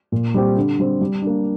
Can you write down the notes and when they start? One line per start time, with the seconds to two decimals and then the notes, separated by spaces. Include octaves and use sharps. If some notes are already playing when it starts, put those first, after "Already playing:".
0.12 A#2
0.34 G3 C4 G4
0.57 D3
0.79 G3 C4
1.01 G3
1.22 A#3 D4